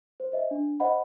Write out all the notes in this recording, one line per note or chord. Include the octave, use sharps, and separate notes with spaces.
C5
C5 D#5 E5
D4
C5 D#5 F#5 B5